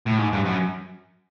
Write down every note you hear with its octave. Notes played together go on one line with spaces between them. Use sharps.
A2
G#2
G2
F#2